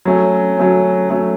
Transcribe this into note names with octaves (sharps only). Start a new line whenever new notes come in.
F#3 A3 C#4
F#3 A3 C#4
F#3 A3 C#4